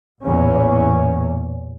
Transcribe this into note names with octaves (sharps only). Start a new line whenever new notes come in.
A1 E2 A#2 C#4